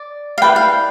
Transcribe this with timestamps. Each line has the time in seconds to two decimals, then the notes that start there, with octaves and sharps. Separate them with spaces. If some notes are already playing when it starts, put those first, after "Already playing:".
Already playing: D5
0.38 F5
0.42 E4 B4 D5 G5
0.56 F5